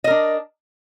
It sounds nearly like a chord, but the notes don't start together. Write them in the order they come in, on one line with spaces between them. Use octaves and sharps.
D#5 A#4 D4